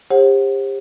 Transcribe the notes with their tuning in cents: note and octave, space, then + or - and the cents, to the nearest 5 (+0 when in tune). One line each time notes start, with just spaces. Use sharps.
G4 +30 C5 +40 F#5 +0